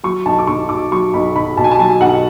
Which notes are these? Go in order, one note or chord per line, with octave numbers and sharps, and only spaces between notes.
F#3 C#6
B1 A5
D6
B1 C#6
B2 D6
F#3 C#6
B1 B5
B1 B5
B2 A5
G#5
A5
F#3 G#5
B1 F#5